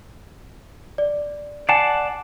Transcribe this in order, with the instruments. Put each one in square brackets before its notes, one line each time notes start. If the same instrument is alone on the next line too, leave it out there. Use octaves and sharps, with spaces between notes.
[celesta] D5
[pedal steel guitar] D5 F#5 A5 [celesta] G#5 C7